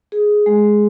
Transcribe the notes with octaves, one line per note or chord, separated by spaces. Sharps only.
G#4
G#3